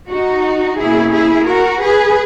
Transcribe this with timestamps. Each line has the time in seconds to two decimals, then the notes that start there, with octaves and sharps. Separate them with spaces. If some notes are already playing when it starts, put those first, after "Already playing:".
0.10 D#4 F#4
0.78 B2 A#3 C#4 E4 G#4
1.13 E4 G#4
1.47 F#4 A#4
1.81 G#4 B4